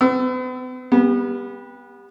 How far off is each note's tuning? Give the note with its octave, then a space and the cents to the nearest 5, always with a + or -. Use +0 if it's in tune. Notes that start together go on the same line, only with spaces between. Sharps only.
B3 +45 E6 +5
G3 +25 B3 -25